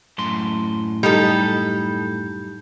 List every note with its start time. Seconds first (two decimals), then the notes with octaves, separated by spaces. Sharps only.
0.18 F#2 A2 C6
1.03 G3 D#4 A4